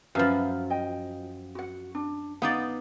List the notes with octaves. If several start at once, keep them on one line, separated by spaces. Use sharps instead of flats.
F#2 F3 B4 E5 F5
D#5 G5
F#4 F#5
D4
B3 D#4 D5 F5